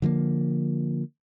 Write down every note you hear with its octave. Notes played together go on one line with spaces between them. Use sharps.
D3 F3 G3 A#3